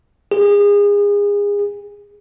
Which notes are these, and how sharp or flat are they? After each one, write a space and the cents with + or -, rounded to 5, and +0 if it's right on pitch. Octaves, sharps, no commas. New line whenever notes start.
G#4 -30